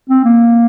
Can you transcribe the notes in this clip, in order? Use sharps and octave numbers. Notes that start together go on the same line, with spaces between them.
C4
A#3